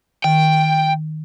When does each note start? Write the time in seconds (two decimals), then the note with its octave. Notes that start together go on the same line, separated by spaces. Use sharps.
0.24 D#3 G5